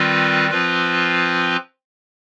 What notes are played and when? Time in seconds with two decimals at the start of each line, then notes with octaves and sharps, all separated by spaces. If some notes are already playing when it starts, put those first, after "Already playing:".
Already playing: D#3 G3 C4 F4 B4
0.50 F3 C4 F4 B4